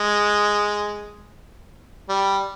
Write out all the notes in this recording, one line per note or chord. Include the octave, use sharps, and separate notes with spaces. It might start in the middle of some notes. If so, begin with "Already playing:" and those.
Already playing: G#3
G3